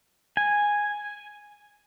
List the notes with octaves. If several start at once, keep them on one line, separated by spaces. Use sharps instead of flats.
G#5